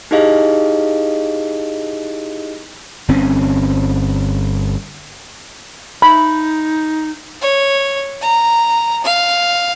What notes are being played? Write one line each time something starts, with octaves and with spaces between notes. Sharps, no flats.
D#4 E4 G4 G#4 D#5 F5
G1 C4 C#4
D#4 B5
C#5
A#5
F5